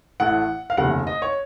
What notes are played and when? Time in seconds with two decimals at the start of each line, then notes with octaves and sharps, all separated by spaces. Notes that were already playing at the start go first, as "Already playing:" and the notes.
0.20 A1 A2 A3 F#5
0.70 F5
0.77 F1 D#2 C#3 A3 F#5
1.07 D#5
1.22 C#5